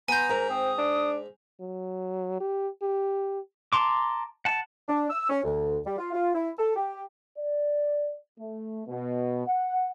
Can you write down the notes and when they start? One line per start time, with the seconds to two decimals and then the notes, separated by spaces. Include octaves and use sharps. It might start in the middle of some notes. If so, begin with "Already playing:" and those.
0.08 B3 G#5 A#5 C6 G6
0.30 G#2 A#4
0.49 C4 D#6
0.78 D4
1.61 F#3
2.40 G4
2.82 G4
3.73 A5 A#5 C6 D6
4.45 F#5 A5
4.88 D4
5.10 E6
5.30 C#4
5.44 D2
5.86 G3
5.98 F4
6.13 F4
6.35 E4
6.58 A4
6.76 G4
7.37 D5
8.39 A3
8.88 B2
9.46 F#5